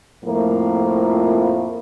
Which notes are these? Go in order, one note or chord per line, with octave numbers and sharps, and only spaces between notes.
F2 A2 F3 A3 A#3 A#4